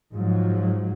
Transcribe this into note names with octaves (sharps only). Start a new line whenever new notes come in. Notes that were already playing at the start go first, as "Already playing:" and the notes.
G#2 F3 F#3